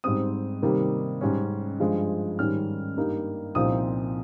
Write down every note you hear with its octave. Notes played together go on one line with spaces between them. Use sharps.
G#2 G3 C4 D#6
C3 D#3 G3 A#3
G#2 G3 C#4
G2 F3 G#3
G#2 D#3 G3 C#4 F6
G2 G3 A#3 D#4
C2 A#2 F3 C4 D#4 D#6